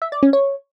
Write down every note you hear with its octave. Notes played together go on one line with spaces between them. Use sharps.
E5
D5
C#4
C#5